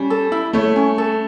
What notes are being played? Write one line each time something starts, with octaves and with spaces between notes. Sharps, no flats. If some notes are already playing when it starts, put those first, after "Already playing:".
Already playing: G3 C#4
A4
E4
A3 C#5
C#4
A4